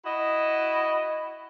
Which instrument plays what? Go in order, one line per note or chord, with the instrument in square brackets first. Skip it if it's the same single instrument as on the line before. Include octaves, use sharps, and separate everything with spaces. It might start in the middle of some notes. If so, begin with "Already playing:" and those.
[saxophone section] E4 F#4 D#5